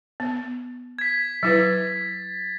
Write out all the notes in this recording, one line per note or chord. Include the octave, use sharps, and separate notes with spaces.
B3
G#6 B6
F#3 E4 B4 A6